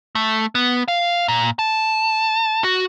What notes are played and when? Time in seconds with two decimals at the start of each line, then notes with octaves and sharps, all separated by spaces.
0.15 A3
0.55 B3
0.88 F5
1.28 A#2
1.59 A5
2.64 F#4